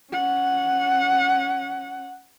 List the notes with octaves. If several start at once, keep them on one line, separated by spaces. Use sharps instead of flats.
C#4 F#5